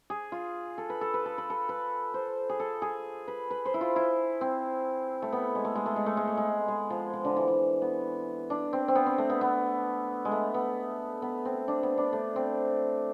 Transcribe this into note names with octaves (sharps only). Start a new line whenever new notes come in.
G#4
F4
A4
B4
A4
B4
A4
B4
A4
B4
C5
G#4
A4
G#4
B4
B4
C5
E4
F4
E4
C4
A3
B3
G#3
A3
G#3
A3
G#3
A3
G#3
A3
G#3
G#3
F3
F3
D3
E3
E3
B3
D4
C4
C4
B3
C4
A3
B3
B3
G#3
A3
B3
B3
C4
D4
B3
D4
A3
C4